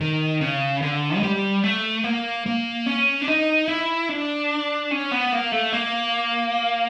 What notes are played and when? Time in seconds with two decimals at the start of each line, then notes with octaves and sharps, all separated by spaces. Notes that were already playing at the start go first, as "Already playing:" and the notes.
0.01 D#3
0.41 C#3
0.82 D3
1.16 G#3
1.23 G3
1.64 A3
2.04 A#3
2.46 A#3
2.86 C#4
3.22 D4
3.28 D#4
3.68 E4
4.09 D4
4.91 C#4
5.11 B3
5.33 A#3
5.52 A3
5.73 A#3